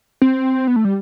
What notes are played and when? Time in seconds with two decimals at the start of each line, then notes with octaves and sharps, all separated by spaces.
0.22 C4
0.67 B3
0.76 A3
0.85 G3